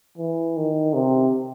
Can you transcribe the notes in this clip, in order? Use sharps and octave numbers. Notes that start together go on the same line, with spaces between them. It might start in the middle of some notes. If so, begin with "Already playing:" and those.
E3
D#3
C3